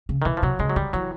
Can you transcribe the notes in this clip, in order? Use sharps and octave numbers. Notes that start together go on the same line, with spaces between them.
C#3
D#3
B2 E3
F3
C3 F#3
C#3 G#3
F#3
D3 G3
E3 F#3